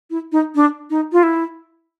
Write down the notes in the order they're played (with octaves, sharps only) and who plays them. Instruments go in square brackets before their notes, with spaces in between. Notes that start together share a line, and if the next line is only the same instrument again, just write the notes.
[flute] E4
D#4
D4
D#4
F4
E4